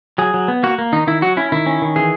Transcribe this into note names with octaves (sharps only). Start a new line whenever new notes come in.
F#3 G#4
F#3
B3
A#3 F#4
A#3
D#3 D#4
D#3 E4
F#3 F#4
C#4 E4
D#3 E4
C#4
D#3
E3 G#4